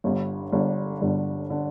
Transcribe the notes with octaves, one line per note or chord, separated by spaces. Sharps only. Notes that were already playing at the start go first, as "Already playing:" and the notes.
G1 G2 D3
G1 G2 D3
G1 G2 D3
D3